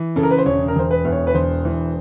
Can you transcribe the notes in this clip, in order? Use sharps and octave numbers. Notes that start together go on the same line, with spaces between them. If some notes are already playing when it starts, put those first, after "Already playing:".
Already playing: E3
C#3 A4
A#4
B4
C5
E1 C#5
A#4
E1 C5
B4
E2
C#5
B4
E1 C5
E3